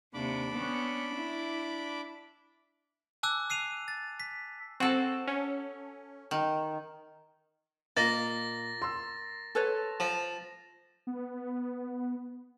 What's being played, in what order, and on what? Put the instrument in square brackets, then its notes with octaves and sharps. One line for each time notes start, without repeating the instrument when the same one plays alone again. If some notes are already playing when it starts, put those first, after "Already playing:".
[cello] D#2 C3 [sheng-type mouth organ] D4 B5 D6
[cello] B3 C#4
E4
[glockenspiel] G#5 A5 D6 E6 F#6
E6 C7 D#7 F7
A6
B6
[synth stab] C4 [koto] F#4 A4
[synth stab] C#4
[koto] D#3
[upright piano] A#2 [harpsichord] A#3 [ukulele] D#5 [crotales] A6 A#6
[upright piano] C6 E6
[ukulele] A4 B4 C#5
[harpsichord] F3
[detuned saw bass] B3